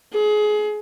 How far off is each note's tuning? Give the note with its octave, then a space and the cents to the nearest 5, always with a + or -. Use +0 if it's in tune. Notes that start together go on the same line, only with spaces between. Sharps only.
G#4 +25